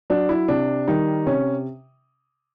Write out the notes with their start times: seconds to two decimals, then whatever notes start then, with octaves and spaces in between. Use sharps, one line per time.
0.10 F#3 D4
0.29 E4
0.48 C3 D4
0.88 D#3 G3 D#4
1.26 C3 C#4